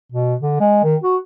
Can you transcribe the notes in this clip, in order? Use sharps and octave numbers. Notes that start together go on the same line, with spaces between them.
B2
D3
G#3
D#3
F#4